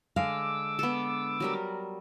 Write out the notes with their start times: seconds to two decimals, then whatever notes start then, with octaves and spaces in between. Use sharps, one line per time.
0.16 D3 G#3 F5 D6 E6
0.79 B3 A4
1.40 F#3 G3 A#4